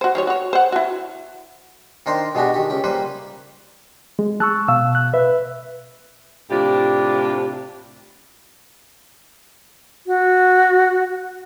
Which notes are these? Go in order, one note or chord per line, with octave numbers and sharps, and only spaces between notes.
F#4 C5
D#3 G3 C#5
F#4 C#5
C5 F#5
E4 F#4
D#3 D4 A#4 C5 G5 C6
B2 G#3 D4 F#4 G4
D#3 G4
C#2 G4
G3 A#3 B4 C5
G#3
A5 C#6 E6 F#6
B2 F5 E6
F#6
B4 E5
A2 C3 D4 F4 G4
F#4